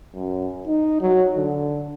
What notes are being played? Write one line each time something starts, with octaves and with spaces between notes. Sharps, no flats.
F#2
D#4
F#3
D3